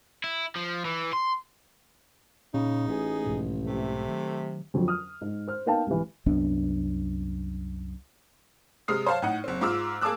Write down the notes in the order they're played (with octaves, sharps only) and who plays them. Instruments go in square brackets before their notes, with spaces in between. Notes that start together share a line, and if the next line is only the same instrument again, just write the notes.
[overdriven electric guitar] E4
F3
E3
C6
[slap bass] A#2 [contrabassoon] C#3 [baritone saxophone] D#4
[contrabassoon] A1 [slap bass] A3 [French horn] G#4
[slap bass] B1 G#2 F3
[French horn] C3 [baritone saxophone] A3
[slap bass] D#3 F#3
[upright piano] F2 D3 F3 F#3
D#6 F6
G#2 D#4
C5 F6
A#3 B3 D#4 F5 G5 A5
C2 G#2 E3
[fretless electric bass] C2 F#2 B3 D4
[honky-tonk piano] C3 G#3 D#6 F6 C7
C5 C#5 F5 A5
A2 D#4 F#5
F#1 C4
G#2 F4 D6 E6 F6
A#3 G#4 A5 D6 E6 F#6